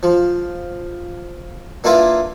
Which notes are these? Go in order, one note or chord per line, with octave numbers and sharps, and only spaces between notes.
F3
A#3 D4 E4 F4 B4 F5